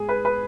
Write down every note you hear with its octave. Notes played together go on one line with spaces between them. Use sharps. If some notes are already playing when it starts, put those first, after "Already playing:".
Already playing: G#2 G#4
B4
B4